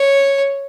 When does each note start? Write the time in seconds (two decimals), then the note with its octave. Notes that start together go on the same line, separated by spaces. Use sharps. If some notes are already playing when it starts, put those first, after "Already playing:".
Already playing: C#5